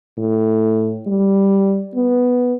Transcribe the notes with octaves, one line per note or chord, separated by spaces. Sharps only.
A2
G3
B3